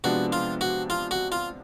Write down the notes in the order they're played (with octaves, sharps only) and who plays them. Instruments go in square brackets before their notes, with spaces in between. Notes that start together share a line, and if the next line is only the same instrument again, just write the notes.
[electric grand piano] C3 F3 G#3 B3 D4 [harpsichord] F#4
[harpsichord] F4
F#4
F4
F#4
F4